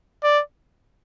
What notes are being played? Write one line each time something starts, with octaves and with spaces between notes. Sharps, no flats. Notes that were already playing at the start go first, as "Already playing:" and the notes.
D5